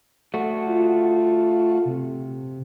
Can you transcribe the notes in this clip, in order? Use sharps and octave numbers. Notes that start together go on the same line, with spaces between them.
A3 F#4
F4
C3